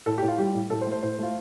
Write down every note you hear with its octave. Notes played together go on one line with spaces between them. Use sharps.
A2 A4
G4
A2
F4
G3 G4
A2
A2 A4
C5
A3
C5
A2 C5
A3 F4